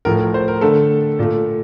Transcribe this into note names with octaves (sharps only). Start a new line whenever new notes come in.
A2 F3 A3 A#4
A#4
C5
A#4
D3 A3 A4
A#2 A3